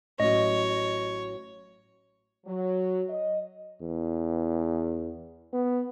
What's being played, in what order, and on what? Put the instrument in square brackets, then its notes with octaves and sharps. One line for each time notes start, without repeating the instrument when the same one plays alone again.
[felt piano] A1 F#3 [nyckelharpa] C#5 [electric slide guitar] D#5
[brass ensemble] F#3
D#5
[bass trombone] E2
B3